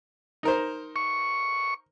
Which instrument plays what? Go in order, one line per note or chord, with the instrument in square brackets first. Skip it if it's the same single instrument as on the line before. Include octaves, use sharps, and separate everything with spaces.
[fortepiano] D#4 A#4 C5
[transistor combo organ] C#6